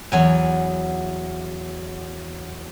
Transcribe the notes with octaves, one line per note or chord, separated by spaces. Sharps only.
E2 F#3 G#5